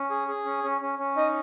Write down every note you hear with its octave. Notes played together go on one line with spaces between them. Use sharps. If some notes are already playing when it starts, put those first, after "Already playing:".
Already playing: C#4
G#4
G#4
C#4
C#4
C#4
C#4
D#4 D#5